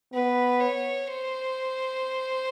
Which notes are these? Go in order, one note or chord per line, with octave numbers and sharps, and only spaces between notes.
B3 B4
C#5
C5